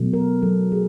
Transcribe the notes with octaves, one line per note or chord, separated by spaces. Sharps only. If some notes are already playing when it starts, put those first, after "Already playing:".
Already playing: B2 F#3 A3
A#4
B2 F#3 A3 A4
G#4